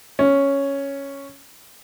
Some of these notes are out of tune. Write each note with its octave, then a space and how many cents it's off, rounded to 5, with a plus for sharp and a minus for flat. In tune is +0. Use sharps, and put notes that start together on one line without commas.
C#4 +0